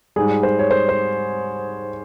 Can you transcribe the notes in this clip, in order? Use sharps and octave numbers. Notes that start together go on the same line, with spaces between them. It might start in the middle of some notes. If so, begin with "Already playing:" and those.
G#2 G3 G#4
C5
C#5
C5
C5